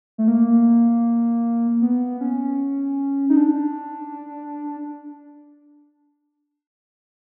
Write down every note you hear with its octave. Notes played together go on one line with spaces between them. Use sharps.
A3
A#3
B3
C#4
D#4
D4